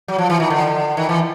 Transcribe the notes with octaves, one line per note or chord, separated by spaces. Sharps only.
F#3
F3
E3
D#3
D3
D#3
E3